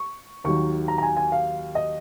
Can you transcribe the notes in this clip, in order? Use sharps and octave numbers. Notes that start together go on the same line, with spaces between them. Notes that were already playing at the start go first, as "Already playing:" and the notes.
Already playing: C#6
D#2 D#3 F#3 C#6
A#5
A#5
G#5
G#5
F5
D#5